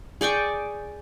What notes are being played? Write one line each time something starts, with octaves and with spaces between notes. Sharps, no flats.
G#4 D5 G5 C#6